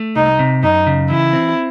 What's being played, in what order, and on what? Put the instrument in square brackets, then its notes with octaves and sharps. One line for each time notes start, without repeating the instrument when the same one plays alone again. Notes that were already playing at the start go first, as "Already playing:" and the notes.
Already playing: [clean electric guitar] A3
[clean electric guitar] C2 [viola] D#4
[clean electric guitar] C3
[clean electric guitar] F#2 [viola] D#4
[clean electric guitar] C#3
[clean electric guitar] E3 [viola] E4
[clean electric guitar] C4